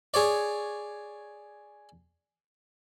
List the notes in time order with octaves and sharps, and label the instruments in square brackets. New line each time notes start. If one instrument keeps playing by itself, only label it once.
[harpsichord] G#4 C#5 D5